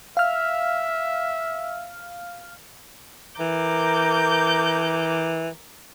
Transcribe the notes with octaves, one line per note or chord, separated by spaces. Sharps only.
E5 F5 F6
E3 A#4 D6 G6